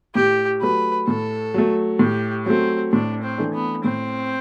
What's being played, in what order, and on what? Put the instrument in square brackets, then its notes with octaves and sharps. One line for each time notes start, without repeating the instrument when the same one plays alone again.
[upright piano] A2 [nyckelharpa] G4
[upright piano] F#3 A3 [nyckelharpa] B4
[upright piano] A2 [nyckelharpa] A4
[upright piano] F#3 A3
[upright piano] A2 [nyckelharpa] G4
[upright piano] F#3 A3 [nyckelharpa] C4
[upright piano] A2 [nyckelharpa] D4
[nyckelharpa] C4
[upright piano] E3 A3 D4
[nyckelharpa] B3
[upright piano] A2 [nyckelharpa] C4